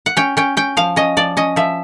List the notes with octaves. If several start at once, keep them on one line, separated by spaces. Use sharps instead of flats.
F#5
C#4 G5
C#4 G5
C#4 G5
F3 F5
C#4 D#5
F3 D5
C#4 D#5
F3 E5